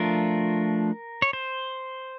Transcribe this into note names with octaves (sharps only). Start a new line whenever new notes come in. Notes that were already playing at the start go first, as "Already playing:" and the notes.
Already playing: F3 A3 D4 F4 A#4
C#5
C5